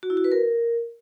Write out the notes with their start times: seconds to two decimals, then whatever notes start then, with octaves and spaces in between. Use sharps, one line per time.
0.03 F#4
0.10 E4
0.17 F#4
0.24 B4
0.32 A#4